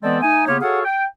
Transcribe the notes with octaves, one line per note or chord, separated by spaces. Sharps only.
E3 G#3 B3 C4 A4 D5
A3 D#4 G#5
C#3 A#3 B3 F4 G4 C#5
F#4 G#4 A4 C#5 F5 F#5
G5